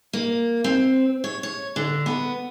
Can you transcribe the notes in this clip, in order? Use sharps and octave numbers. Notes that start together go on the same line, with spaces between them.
A#3
C4
C#5
C#5
D3
B3